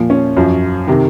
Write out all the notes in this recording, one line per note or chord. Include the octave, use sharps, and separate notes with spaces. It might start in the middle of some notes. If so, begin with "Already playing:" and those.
Already playing: A#2 F3
C#4
F#2 F3
C3 D#3